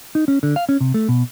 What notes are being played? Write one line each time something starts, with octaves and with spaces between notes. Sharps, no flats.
D#4
C#4
D3
F5
C#4
C3
A3
B2